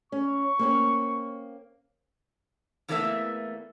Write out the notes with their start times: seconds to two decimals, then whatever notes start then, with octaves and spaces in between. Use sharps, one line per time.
0.12 C#4 C#6
0.59 A#3 C4 C#4
2.88 E2 E3 A3 A#3 D4 E5